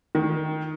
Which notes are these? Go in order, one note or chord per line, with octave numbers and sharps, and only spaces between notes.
D#3